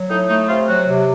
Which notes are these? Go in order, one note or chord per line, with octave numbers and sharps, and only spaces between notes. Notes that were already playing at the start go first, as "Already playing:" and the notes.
Already playing: F#3
A2 D#4
A3 D#4
C3 F4
F#3 F#4
C3